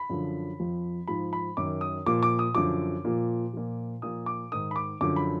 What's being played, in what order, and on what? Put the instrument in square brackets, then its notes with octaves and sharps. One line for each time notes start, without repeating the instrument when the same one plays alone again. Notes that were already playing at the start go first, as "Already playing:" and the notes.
Already playing: [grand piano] B5
F#2 D3 F3
F2 F3
G#2 F3 B5
B5
F#2 D#3 D6
D#6
A#2 F3 D6
D6
D#6
F#2 D3 F3 D6
A#2 F3
A#2 F3
A#2 F3 D#6
D6
G#2 D#3 D#6
B5
D6
F#2 D3 F3 D6
B5